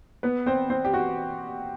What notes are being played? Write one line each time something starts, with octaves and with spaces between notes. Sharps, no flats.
B3 B4
C4 C5
C4 C5
G4
F#4